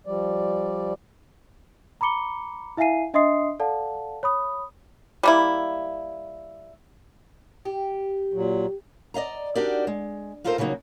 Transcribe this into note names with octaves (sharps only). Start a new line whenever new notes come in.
F3 G3 D5
A#5 B5 D6 C#7 G7
E4 E5 F5 G#5 C7 D#7
D4 D#5 E5 C6 D#6 C7
A4 D5 F5 F#5 A5
C#5 B5 D#6
G3 A#3 E4
G4
A#2 F#3
D5 D#5 F5 A#5
D4 D#4 F#4 G4 A#4 D5
G#3
A#3 D#4 F4 A4 A#4 C5
C#3 F3 F#3 A#3 D#4